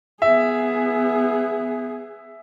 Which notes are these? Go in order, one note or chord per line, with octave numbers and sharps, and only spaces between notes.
B3 G#4 E5